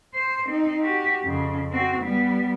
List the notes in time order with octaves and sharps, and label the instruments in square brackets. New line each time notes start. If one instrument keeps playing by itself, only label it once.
[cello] C5
C4 D#4
F#4 G4
F2 C#3
C4 F#4
G3 B3